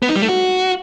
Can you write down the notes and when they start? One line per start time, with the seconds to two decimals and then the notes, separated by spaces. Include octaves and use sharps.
0.02 B3
0.09 D#4
0.16 G3
0.22 A3
0.29 F#4